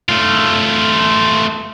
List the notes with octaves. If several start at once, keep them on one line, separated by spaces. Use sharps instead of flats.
A3 F4